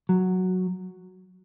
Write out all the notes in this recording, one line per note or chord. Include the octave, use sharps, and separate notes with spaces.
F#3